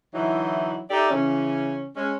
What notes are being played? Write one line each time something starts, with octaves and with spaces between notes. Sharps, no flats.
D3 E3 F#3 D#4 E4
D#4 G4 A4 D5 E5
C#3 E3 C#4
G#3 C#4